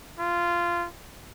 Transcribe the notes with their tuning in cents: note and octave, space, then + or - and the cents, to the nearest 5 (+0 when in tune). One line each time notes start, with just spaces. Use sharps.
F4 -15